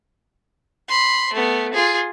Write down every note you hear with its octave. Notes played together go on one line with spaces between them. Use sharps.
B5 C6
A3 B3
F4 G#4